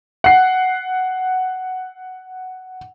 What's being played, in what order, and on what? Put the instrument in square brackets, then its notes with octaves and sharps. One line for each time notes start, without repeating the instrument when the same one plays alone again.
[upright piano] F#5 C7